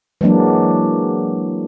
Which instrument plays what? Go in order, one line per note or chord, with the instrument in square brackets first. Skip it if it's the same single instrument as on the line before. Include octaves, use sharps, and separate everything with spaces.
[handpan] E3 F#3 G#3 A#3 D4